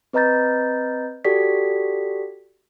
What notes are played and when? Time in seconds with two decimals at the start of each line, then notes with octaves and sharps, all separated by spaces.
0.13 C4 B4 D#5 A#5 G6 A6
1.25 F#4 G4 A4 D5 B6